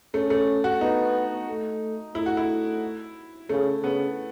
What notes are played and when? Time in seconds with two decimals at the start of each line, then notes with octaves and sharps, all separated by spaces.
0.14 A3 C#4
0.30 A3
0.64 F#4
0.81 B3 D#4
1.48 A3
2.15 A3 E4
2.26 F#4
2.37 E4
3.49 C#3 A3
3.83 C#3 B3